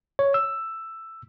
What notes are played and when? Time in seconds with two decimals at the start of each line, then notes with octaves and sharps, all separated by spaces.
0.19 C#5
0.34 E6